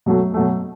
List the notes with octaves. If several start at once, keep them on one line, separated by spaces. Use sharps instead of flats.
B2 F#3 A3
B2 F#3 A3